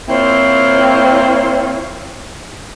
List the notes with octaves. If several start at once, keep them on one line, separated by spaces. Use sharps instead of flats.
A#3 C4 E4 F4 C5 C#5